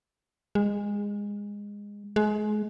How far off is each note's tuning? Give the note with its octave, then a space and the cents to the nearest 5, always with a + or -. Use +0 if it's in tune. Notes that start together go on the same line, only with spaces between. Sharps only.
G#3 -20
G#3 +30